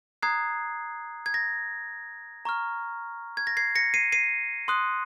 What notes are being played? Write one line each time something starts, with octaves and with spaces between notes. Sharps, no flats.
A#5 D#6 F#6 G#6 C7
G#6
A#6
A#5 C#6 F6
G#6
A#6
G#6 C7
A#6 C#7
C7 D#7
C7 D#7
C6 D#6 F#6